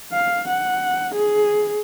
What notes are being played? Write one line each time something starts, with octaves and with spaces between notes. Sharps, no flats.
F5
F#5
G#4